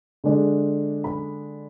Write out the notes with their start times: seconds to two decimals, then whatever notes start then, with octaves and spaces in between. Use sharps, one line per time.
0.24 D3 G#3 D4
1.04 B5